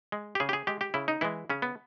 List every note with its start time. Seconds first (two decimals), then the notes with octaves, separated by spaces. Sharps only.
0.12 G#3
0.35 G4
0.40 C#3 G#4
0.49 G4
0.53 G#4
0.67 G#3 G4
0.81 G4
0.94 C#3 E4
1.08 D#4
1.21 E3 G#3 E4
1.50 C#3 C#4
1.62 B3